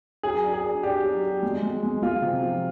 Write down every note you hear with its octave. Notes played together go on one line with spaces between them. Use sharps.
F#3 G#4
D4
G#4
D4
D4 G4
F#3
F#3
G#3
G#3
G#3
G#3 F4
C3
F3